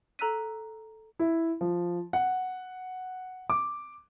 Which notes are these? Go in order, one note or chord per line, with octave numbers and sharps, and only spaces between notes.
A4 A#5 E6 F#6 B6 D#7
E4
F3
F#5
D6